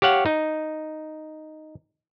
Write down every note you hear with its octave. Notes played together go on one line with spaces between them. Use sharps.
G4 C#5 F5 F#5
D#4